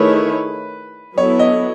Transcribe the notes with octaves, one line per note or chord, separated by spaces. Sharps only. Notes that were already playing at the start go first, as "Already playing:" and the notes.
Already playing: D#3 A3 E4 G#4 B4 C#5
F#3 B3 E4 A4 C#5
D#5